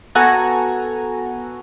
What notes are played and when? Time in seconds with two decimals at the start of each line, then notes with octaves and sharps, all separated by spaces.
0.15 B3 F#4 A4 G#5 A#5